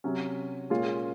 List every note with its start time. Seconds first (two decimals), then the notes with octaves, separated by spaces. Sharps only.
0.04 C3 F#3 C#4
0.70 A#2 G#3 C#4 F4